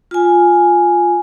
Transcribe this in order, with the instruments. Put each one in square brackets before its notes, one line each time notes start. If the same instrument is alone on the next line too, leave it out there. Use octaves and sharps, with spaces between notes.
[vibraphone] F4 G#5